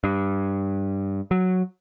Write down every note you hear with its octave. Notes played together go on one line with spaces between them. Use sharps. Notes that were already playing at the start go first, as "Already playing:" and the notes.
G2
F#3